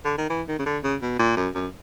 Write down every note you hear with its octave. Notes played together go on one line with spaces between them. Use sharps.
D3
D#3
E3
D#3
C#3
D3
C#3
B2
A#2
F#2
F#2